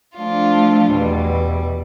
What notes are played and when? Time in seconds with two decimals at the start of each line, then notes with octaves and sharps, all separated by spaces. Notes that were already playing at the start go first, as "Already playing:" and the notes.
0.16 F3 A3 D4 F4
0.90 E2 B2 G3